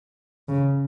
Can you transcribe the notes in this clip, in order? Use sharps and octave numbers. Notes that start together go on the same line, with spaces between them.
C#3